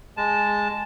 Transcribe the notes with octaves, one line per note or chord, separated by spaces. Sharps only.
G#3 A5